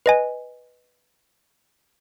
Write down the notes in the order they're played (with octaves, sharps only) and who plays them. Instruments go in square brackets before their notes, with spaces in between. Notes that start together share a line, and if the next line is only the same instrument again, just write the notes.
[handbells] B4 D#5 G#5